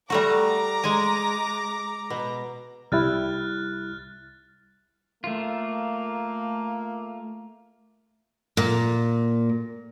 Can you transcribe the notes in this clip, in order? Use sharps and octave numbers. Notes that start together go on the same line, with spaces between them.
G3 A3 F#4 A#5 D6
G#3 G#5
B2
C2 G3 E4 F6 F#6 A6
A3 A#3 F4
A#2